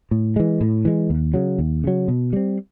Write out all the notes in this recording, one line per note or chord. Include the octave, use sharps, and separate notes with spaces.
A2
E3 G#3
A2
E3 G#3
D#2
C#3 F#3
D#2
C#3 F#3
B2
G3 C4